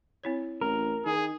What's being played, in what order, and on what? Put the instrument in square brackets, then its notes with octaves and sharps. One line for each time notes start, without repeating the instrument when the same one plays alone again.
[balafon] C4 E4 C#5
[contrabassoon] A1 [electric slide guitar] A#4
[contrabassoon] D#3 [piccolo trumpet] G#4